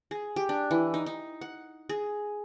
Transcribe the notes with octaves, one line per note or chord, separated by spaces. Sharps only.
G#4
G4
D4
E3
D#4
D#4
F#5
G#4